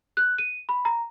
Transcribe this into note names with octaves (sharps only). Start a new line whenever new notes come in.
F#6
D#7
B5
A#5